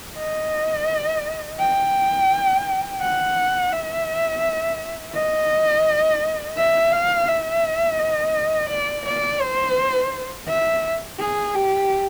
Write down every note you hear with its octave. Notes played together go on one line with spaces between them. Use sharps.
D#5
G5
F#5
E5
D#5
E5
F5
E5
D#5
D5
D5
C5
E5
G#4
G4